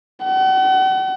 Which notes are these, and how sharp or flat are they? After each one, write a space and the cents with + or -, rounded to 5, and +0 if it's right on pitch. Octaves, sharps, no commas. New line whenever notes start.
F#5 +40